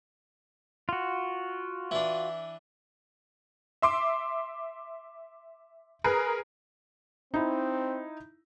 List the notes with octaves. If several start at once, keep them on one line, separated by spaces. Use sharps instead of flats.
F4 F#4
E3 D4
E5 C6 D6
G#4 A#4 B4
C4 D#4 E4